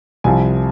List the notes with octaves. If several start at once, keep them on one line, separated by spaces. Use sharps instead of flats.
C2 C3 F3 G#5